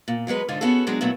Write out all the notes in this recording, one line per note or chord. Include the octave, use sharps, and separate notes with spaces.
A#2
E2 F#3 G#3 B4
G#2 D3 D4 D#4 F4
B3 C#4 F#4 G#4 A4
F#3 G#3 D4 G#4
A#2 F#3 A3 B3 E4